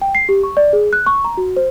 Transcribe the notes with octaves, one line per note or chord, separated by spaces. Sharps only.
G5
C7
G4
C#6
D5
G#4
F#6
C#6
A#5
F#4
C5